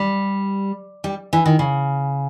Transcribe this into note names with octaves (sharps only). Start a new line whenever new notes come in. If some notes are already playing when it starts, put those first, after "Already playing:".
Already playing: G3
G3
E3
D#3
C#3